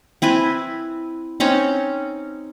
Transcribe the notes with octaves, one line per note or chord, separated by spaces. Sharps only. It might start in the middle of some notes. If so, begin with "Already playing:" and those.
C4 E4 B4 G#5
C4 C#4 D#4 C#5